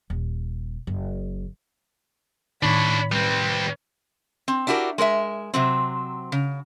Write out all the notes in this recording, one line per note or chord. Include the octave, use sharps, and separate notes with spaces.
D#1
F#1
A2 D#3 D4 C#5 B5
G3 C4 B4
C4
D4 E4 F#4 G4 A#4
G#3 A#4 C#5 E5
C3 F#3 C4
C#3